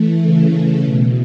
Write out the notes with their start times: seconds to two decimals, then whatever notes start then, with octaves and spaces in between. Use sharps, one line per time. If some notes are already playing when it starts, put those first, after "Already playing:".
Already playing: E3 A3
0.23 C#3
0.83 B2